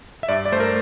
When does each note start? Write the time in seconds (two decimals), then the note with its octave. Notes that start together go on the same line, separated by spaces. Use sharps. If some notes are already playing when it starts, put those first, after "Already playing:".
0.23 E5
0.29 G2 D5
0.45 D5
0.52 A3 C5
0.60 A#4